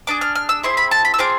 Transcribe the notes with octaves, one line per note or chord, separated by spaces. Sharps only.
D4 G#4 D6
F6
F6
E6
C4 E4 G#4 C6
B5
A5
B5
E6
C4 F4 G#4 D6